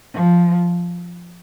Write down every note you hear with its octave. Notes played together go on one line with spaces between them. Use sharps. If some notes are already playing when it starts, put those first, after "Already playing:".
F3